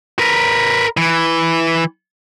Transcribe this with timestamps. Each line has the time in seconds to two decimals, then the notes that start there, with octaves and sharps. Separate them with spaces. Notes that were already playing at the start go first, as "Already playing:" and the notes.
0.19 A#4 B4
0.97 E3